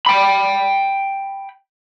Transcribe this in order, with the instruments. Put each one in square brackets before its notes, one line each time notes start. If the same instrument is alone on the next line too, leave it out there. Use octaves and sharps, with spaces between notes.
[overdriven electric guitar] G5 B5